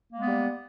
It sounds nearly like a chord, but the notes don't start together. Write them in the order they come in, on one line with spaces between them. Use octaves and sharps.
A#3 G#3 B3 G3